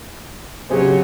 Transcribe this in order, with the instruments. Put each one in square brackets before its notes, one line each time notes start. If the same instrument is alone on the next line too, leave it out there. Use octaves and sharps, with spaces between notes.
[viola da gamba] C#3 F#3 C#4 [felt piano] G4 G#4 C5